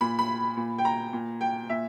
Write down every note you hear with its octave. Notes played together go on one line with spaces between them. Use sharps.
A#2 B5
B5
A#2
G5
A#5
A#2
G5
A#2 E5